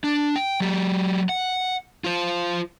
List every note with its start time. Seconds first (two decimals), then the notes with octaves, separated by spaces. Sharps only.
0.04 D4
0.36 G5
0.60 F#3 G4
1.29 F#5
2.04 F4 C5